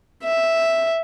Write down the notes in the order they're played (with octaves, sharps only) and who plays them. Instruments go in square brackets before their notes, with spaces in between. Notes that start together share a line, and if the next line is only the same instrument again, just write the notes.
[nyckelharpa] E5